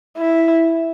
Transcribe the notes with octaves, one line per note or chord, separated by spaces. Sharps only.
E4